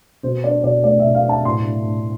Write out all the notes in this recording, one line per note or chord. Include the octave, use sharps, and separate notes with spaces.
B2 C5
D4 D5
B2 D5
A3 D5
B2 E5
F5
D4 A5
A2 C6
A3
A2